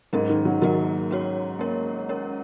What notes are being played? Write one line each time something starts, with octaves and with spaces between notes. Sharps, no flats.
G#2 F#3 C#4 A#4
D#3
F#3
D#3 F#3 A#3 F#4 A#4
C#4 F#4 C#5
A#3 C#4 A#4 C#5
C#4 A#4 C#5